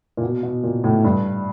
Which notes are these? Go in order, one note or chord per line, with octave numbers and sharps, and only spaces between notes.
A#2
B2
B2
A#2
A2
G2